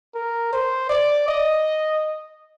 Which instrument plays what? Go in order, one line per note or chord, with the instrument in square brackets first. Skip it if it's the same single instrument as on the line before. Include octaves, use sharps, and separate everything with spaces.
[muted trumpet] A#4
C5
D5
D#5